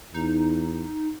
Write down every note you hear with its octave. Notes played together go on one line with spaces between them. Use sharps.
E2 D#4